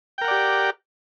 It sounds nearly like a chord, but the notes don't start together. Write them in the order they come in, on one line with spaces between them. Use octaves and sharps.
G5 A#4 F#5 D5 G4